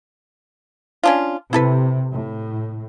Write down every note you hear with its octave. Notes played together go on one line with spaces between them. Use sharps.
C#4 D4 F4
C3 E4 A4 B4
A2